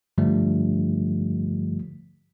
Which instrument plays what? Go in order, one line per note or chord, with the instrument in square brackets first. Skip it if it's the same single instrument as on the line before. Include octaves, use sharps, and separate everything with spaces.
[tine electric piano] G2 D3 F3 G3 A3